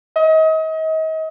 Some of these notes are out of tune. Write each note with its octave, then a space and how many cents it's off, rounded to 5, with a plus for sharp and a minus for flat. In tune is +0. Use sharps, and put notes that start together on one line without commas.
D#5 +35